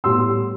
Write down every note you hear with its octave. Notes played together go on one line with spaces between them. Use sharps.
A2 G3 B3 C6 E6